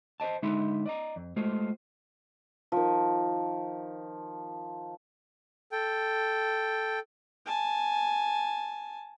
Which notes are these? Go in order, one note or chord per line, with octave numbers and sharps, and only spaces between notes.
C5 C#5 D#5 A5
D3 G#3 D#4 E5 B5 C6
D5 D#5 A#5
F2
G#3 A3 F4 C5
D#3 F3
A4 G5
G#5 A5